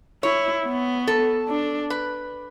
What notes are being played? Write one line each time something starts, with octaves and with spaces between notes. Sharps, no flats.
E4 C#5
B3
A4
D4
B4